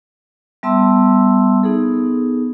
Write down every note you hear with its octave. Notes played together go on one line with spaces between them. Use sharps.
G3 B3 E5 A5 C6 E6
B3 D#4 G#4 A4